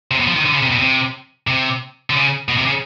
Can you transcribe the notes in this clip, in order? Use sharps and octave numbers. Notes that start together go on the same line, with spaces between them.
C3
B2
F3
D#3
D3
C#3
C3
B2
C3
C3
D3
C#3
B2
C3
C#3